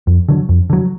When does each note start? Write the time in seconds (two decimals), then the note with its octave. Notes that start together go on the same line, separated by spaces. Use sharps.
0.07 F2
0.29 D3 F#3
0.49 F2
0.70 D3 F#3